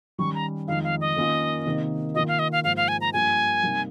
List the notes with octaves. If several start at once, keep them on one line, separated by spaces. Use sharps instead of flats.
D#3 G3 C#4 C#6
A#5
F2 D#3 G#3 D#4 F5
F5
D#5
D#3 A#3 C#4 F4
C3 D#3 A#3 D#4
D#3 A#3 F4 D#5
F5
D#5
F5
G#2 F3 A#3 D#4 F5
F5
G#5
A#5
G2 F3 A#3 G#5
C3 G3 A#3 D#4